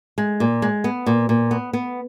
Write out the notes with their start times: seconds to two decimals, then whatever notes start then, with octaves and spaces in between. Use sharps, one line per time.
0.18 G#3
0.40 A#2
0.62 G#3
0.84 B3
1.06 A#2
1.29 A#2
1.51 B3
1.73 B3